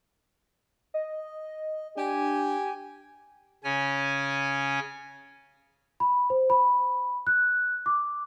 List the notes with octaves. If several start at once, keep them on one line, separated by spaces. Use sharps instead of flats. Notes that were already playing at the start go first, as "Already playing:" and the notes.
D#5
D4 G4 G#5
C#3 C#4 C#5 G#5
B5
C5
B5
F#6
D6